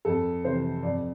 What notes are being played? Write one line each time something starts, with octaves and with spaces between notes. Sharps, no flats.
F2 A4
C3 E3 C5
F2 D5